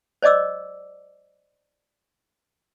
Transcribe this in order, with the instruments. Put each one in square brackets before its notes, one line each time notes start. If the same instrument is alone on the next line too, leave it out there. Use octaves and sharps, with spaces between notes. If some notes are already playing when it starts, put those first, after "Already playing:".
[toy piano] C5 D5 D#5 D6 E6